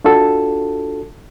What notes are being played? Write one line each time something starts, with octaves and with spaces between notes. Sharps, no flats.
D4 F4 F#4 A4